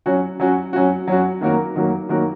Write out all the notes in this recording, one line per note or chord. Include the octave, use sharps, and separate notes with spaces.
F#3 C#4 F#4
F#3 C#4 F#4
F#3 C#4 F#4
F#3 C#4 F#4
D#3 F#3 A#3 F#4 A#4
D#3 F#3 A#3 F#4 A#4
D#3 F#3 A#3 F#4 A#4